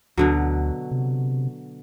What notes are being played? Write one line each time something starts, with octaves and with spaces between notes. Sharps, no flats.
D2 B2 D3 F#3
C3